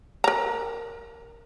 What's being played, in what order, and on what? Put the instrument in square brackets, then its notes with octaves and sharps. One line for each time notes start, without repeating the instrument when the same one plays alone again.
[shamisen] A#4 A#5